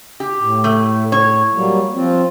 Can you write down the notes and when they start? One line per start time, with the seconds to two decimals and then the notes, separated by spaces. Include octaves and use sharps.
0.20 G4
0.40 A2
0.64 A3
1.12 C#5
1.53 F#3 G3 A#3
1.94 F3 C4 F4